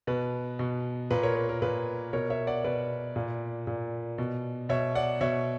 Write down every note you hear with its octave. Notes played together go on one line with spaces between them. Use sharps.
B2 B4
B2
A#2 B4
A#4 C#5
B4
A#4
A#2 B4
B2 A#4 C#5
C#5 E5
D5 F#5
B2 B4 D5
A#2
A#2
B2
B2 C#5 E5
D5 F#5
B2 C#5 E5